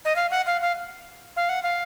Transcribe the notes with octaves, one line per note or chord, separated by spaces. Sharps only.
D#5
F5
F#5
F5
F5
F5
F#5
F5